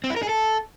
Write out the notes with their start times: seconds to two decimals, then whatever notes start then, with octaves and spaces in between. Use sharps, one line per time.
0.04 C4
0.10 E4
0.16 A#4
0.23 G#4
0.29 A4